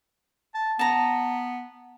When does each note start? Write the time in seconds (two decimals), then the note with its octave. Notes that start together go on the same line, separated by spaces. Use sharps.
0.55 A5
0.79 B3 A5 A#5